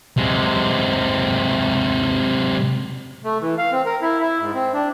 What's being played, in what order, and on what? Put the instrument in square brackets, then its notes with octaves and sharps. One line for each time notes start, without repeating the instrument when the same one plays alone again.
[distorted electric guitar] C3 G#3
[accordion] A3
E3
F5
C4
A#4
E4
E4
G#2
C4
D4